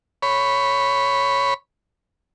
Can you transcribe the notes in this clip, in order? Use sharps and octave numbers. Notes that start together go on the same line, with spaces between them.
C#5 B5